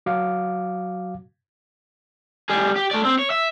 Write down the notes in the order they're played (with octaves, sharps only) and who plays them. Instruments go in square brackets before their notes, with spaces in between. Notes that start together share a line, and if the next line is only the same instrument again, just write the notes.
[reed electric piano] F#3 F#4 F5 D6
[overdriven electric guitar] G3 G#4
G4
A3 D5
C4
C#5
E5